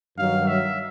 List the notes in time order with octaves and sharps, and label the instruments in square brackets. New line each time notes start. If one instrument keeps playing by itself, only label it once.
[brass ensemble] G2 D#3 F#3 [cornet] F5
[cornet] E5